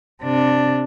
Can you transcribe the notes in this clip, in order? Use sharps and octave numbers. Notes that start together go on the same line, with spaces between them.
C3 D4